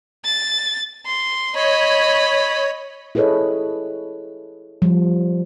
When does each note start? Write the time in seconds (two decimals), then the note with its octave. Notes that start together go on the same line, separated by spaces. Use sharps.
0.24 A6
1.06 C6
1.56 C#5 D#5 B5
3.15 E4 G#4 A4 B4 C#5 D#5
4.82 F3 G3